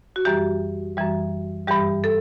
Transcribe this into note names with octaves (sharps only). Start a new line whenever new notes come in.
F#4
F#2 E3 G3 G4
F#2 E3 G3
G2 E3 G3 G4
A4